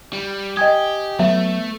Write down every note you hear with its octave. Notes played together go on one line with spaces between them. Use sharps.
G3
G4 D#5 G5 G#5 D#6 G#6
F#3 A3 B3 E5